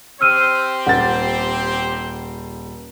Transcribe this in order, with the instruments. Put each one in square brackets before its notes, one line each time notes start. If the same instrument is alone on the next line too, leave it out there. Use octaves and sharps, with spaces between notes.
[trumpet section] C4 G4 C5 [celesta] E6 F6 D#7
[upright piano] D#1 A6 [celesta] F#5